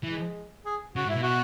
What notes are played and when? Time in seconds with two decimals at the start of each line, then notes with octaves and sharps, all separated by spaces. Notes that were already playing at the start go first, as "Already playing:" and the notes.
0.04 E3 G#3
0.66 G#4
0.96 C#3 F#4
1.06 G#2
1.09 E4
1.16 B2
1.23 F#4